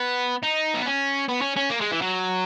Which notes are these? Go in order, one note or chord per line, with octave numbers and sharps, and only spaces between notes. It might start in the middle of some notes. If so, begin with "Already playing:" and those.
Already playing: B3
D#4
B3
C#4
B3
C#4
C#4
A#3
G#3
E3
F#3